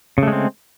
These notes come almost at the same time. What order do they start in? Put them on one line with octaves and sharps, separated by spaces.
C#3 A3 G#3 C4